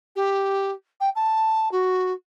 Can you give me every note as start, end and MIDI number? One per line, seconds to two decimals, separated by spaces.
0.16 0.71 67
1.00 1.10 79
1.16 1.71 81
1.72 2.13 66